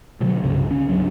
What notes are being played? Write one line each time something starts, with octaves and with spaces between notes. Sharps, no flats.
B2 D3 F#3
C2 G2 C#3
D3 C#4
C#2 G2 F#3 D4